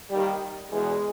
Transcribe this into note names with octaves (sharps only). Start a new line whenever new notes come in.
D#2 D#3 G3
E2 B2 G#3